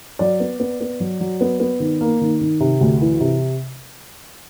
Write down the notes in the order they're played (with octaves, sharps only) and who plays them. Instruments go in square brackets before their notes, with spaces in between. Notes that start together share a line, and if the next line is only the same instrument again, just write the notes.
[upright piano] F#3 D5
B3
B3
B3
F#3
F#3
B3
B3
D#3
A#3
D#3
D#3
C3
D2
E3
C3